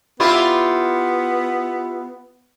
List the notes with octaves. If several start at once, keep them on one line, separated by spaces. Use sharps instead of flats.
B3 E4 F4 G4